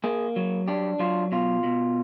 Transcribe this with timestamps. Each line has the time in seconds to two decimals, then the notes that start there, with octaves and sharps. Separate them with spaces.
0.04 A#3 G#4
0.36 F#3
0.68 D4 G4
0.99 F#3 F4
1.32 B2 F4
1.64 B2